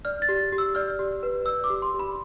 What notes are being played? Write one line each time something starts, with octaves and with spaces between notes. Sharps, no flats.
D5 F6
A6
G4
G4
E6
D5 F6
G4
B4
D5 E6
D6
G4
C6
G4
B5